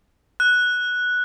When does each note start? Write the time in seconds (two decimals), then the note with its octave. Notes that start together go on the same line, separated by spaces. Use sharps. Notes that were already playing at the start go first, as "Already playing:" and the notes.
0.40 F#6